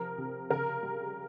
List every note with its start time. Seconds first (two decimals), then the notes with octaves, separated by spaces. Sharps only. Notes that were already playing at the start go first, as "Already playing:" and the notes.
Already playing: C3 F3 A#4
0.18 C3
0.50 C#3 A#4
0.83 G3